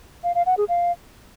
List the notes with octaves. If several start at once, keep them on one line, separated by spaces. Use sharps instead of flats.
F5
F5
F#5
G#4
F5